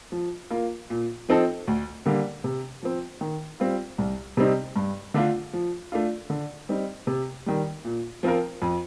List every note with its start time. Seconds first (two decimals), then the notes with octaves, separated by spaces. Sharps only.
0.12 F3
0.51 A#3 F4
0.90 A#2
1.29 F3 C4 D#4 A4
1.67 D2
2.06 D3 G3 A#3
2.44 C3
2.83 F3 C4
3.21 D#3
3.60 G3 C4 F4
3.98 C2
4.37 C3 G3 C4 D#4
4.76 G2
5.14 D3 A3 D4 F4
5.53 F3
5.92 A3 D4 F4
6.30 D3
6.69 G3 C4 D#4
7.07 C3
7.46 D#3 G3
7.85 A#2
8.23 F3 C4 F4 A#4
8.62 F2